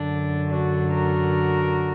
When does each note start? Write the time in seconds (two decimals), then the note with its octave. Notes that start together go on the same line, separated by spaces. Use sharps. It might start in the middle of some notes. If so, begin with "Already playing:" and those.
Already playing: F#2 D3 D4
0.48 D4 F#4
0.93 F#4 A#4